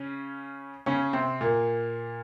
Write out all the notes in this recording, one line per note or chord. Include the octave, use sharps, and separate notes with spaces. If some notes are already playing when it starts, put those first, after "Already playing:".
Already playing: C#3 C#4
C#3 C#4
C3 C4
A#2 A#3